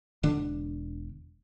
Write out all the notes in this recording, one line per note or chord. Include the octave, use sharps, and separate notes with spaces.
E1 D3 D4